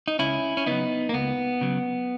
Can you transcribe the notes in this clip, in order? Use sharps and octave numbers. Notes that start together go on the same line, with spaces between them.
D#4
C#2 C#4 E4
C#4
C#3 F#3 B3 D#4
A#3
C#2 B3
C#3 F#3